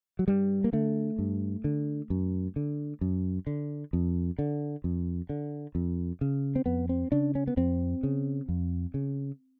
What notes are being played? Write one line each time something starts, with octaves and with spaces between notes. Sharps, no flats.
F#3
G2 G3
A#3
D3 A3
G2
D3
F#2
D3
F#2
D3
F2
D3
F2
D3
F2
C#3
C4
F2 B3
C4
C#3 D4
C#4
B3
F2 C4
C#3
F2
C#3